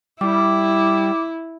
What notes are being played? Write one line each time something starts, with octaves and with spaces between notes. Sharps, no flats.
G3 E4 D6